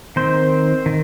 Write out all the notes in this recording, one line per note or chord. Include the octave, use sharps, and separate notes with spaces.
D#3 C4 C5
D#3